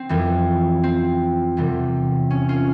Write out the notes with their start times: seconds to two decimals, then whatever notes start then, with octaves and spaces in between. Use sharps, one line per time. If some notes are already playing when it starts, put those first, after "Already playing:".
Already playing: C4
0.09 F2 E3 G3
0.83 C4
1.57 E2 C3 E3 G3
2.30 C#4
2.49 C#4 F4